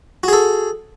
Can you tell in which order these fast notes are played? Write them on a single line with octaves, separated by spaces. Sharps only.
F#4 G#4 A4